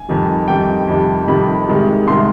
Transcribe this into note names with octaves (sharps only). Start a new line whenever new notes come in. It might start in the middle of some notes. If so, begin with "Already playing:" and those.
Already playing: G#5
F2 D#3 G3
F2 D#3 G3 G5
F2 C3 D#3 G3
F2 C3 D#3 G3 B5
C2 C3 D#3 G#3
C2 C3 D#3 G#3 C6